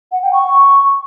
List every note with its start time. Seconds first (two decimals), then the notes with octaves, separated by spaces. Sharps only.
0.12 F#5
0.22 G5
0.33 C#6